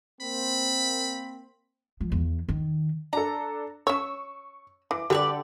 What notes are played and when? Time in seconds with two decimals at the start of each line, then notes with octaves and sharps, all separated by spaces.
0.21 A#3 C4 C5 B5
2.01 F3
2.12 E2
2.48 D#3
3.13 D4 A4 A#5
3.87 C#4 C#5 C#6 E6
4.91 E3 D6
5.10 D3 G3 G4 A4 B4 C#5 D5